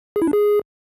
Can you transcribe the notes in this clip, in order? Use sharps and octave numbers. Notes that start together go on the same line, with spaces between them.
G#4
E4
D4
G#4